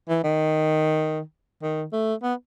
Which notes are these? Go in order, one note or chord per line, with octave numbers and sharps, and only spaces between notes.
E3
D#3
D#3
A3
B3